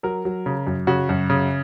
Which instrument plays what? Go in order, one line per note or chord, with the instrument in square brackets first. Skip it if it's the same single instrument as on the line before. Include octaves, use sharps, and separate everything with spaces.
[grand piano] F#3 A#4
F#3
C#3
F#2
C#3 F#4
F#2
C#3